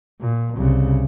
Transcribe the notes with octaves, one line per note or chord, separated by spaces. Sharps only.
A#2
C2 C#3